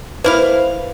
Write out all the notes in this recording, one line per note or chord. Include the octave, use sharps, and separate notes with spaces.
A#3 E4 B4 C5 F5